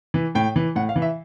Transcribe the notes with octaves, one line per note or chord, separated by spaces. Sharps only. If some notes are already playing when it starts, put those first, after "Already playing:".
E3
A2 G5
E3
A2 F#5
F5
E3
E5